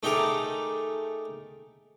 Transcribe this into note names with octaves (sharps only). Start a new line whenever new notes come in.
A3 D#4 G4 G#4 A#4